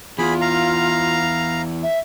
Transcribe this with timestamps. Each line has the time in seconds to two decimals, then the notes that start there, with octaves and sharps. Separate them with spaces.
0.18 E2 F4 G#4 B5
0.41 F5 A#5
1.83 E5